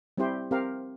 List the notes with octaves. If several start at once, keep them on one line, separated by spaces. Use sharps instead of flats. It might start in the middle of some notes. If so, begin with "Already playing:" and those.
G3 C4 E4 G4 C5
C4 G4 A#4 F5